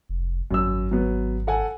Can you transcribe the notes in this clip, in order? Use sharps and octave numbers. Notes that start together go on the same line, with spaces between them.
F1
G#1 F#2 E6
F#3 B3
A4 F#5 G#5